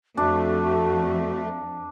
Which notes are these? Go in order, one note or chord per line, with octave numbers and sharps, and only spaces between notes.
F2 A3 D4 F#4